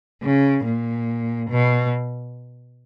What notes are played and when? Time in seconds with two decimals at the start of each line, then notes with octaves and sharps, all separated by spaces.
0.23 C#3
0.65 A#2
1.50 B2